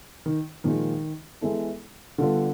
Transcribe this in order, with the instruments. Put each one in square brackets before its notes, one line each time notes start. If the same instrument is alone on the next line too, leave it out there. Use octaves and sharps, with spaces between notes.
[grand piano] D#3
[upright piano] A#2 F3 G#3 [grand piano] D#3
[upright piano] E3 G#3 B3 E4 A4
[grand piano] D3 [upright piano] G3 B3 D4 F4 A4